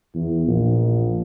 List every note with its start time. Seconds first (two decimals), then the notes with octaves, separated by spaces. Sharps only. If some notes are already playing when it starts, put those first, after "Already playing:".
0.15 E2
0.47 A#1